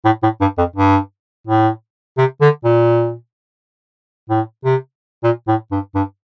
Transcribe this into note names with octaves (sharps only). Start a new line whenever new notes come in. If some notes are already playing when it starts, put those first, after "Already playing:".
A2
A2
G2
F2
G2
A2
C3
D3
A#2
A2
C3
A#2
A2
G2
G2